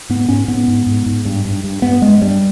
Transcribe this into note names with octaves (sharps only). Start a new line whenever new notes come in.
G#2 B3
G#2 C#4
G#2 B3
G#2
G#2
G#2
G2
G2
G2
G2 B3
G2 G#3
G2 G3